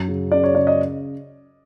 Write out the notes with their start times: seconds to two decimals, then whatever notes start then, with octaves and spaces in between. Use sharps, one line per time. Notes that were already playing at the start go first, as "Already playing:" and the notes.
Already playing: F#2 F#3
0.08 C#3
0.32 C#3 D5
0.44 C#5
0.55 C#3 D5
0.67 D#5